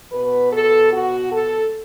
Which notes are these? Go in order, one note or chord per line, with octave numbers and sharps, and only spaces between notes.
B2 B3 B4
A4
F#4
A4